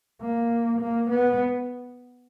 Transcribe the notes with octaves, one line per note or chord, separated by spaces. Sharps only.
A#3
A#3
B3